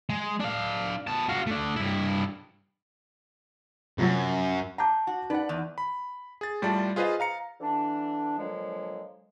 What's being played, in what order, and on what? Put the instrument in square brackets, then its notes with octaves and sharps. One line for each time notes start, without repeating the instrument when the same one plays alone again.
[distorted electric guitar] G#3
D4 F5
B3 A5
F#4 F5
A3 D4
G2 E4
[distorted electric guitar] F#2 [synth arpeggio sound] C3 F3 F#3
[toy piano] F#5 A5 [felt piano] A#5 D6 G6
[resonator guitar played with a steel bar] F#4
[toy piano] D#4 [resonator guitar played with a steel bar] B4 [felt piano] D5 F#5
[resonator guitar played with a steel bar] E2
[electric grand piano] B5
G#4 A6
A2 G3 F4 D5 A5
F4 G#4 B4 C5 D#5 F5
F5 A#5 C#7
[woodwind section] D3 E3 D4
A#2 D3 F3 F#3 G#3